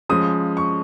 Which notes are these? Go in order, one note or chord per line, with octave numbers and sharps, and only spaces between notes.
C#3 F3 G#3 D#6
C#6